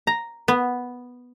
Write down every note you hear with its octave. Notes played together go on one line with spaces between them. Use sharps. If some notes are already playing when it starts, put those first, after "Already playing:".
A#5
B3